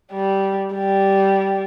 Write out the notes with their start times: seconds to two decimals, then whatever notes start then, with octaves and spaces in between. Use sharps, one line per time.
0.12 G3
0.75 G3